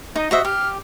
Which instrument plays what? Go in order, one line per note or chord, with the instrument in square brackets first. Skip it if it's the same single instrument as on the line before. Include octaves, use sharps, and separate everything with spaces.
[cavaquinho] D#4 [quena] D#5
[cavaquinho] F#4 D#5 E5 [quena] C5
[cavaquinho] G4 [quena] F6